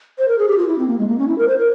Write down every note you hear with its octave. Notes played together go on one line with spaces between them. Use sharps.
C5
A#4
G#4
G4
F4
E4
C4
A#3
G#3
A#3
C#4
E4
A#4
C5
A#4